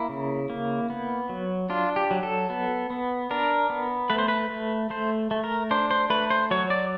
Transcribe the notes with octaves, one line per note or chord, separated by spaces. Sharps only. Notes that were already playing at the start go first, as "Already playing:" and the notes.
Already playing: A#3 E4
C#3
A#3
B3
F#3
D4 F4
G4
F#3
A4
B3
B3
D4 A#4
B3
A3 B4
C5
B4
A3
A3 C5
A3
A#4
D4 C5
C5
A3 B4
C5
F#3 C#5
D5